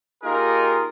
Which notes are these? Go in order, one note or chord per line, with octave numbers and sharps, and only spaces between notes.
A#3 D#4 F4 G4 G#4 A#4